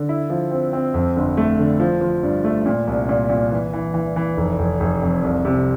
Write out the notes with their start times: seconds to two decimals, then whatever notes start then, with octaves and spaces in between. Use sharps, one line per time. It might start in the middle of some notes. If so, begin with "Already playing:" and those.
Already playing: D3
0.09 E4
0.30 F3
0.51 C4
0.73 C4
0.94 F2
1.16 G1
1.37 A3
1.59 D3
1.80 F3
2.01 F3
2.23 G2
2.44 A3
2.66 A#2
2.87 C2
3.09 A#2
3.30 A#2
3.51 E3
3.73 E3
3.94 E3
4.16 E3
4.37 F1
4.59 F1
4.80 F1
5.02 F2
5.23 C2
5.45 C3